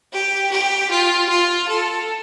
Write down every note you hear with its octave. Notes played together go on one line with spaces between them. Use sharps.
G4
G4
F4
F4
A4